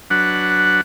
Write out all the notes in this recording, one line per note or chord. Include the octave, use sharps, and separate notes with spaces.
F#3 D4 B4 F#5